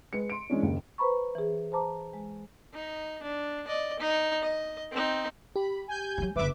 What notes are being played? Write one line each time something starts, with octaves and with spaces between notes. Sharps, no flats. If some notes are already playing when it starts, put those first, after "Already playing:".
G#3 B4 C#7
C6 D7
E3 G#3 C#4 D4
F#1 D#2
B4 C5 A#5 B5 C#6
E3 G#4
C5 A5 A#5 D6
G#3
D#4
D4
D5 D#5
D#4
D#5
C4 D#4
G4 B5
G#5 G6
E3 F#3
F#1 D3 B4 E5 D6